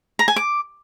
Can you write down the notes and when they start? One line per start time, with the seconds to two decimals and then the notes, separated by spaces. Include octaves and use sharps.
0.19 A#5
0.28 G#5
0.36 D6